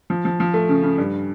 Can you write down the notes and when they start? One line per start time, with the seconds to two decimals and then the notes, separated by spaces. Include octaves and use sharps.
0.10 F3
0.25 F3
0.40 F3
0.54 A3
0.69 C#3
0.83 C#3
0.98 G2